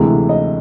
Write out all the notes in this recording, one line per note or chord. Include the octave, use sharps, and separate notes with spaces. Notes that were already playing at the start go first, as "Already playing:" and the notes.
Already playing: D2 C3 E3 G#3
D#5